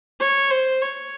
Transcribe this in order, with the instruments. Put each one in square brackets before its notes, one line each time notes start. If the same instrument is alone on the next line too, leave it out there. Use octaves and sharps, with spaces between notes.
[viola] C#5
C5
C#5